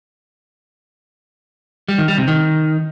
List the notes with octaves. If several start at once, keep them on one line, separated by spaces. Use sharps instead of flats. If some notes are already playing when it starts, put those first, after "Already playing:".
G3
D#3
G3
C3
D#3